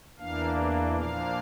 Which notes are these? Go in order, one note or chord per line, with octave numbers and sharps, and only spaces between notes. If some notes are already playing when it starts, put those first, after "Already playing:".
E2 E3 A#3 D4 F5
A#2 F3 A#3 D4 F5